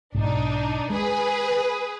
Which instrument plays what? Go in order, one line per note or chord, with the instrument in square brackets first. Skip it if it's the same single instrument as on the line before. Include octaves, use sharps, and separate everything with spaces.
[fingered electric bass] B1 G#2 [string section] D4 D#4
[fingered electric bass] G#3 [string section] G#4 B4